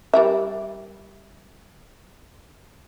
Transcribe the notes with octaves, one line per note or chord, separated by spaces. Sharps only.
G3 A#4 E5